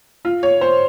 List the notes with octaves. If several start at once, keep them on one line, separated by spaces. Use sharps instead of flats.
F4
C#5
C5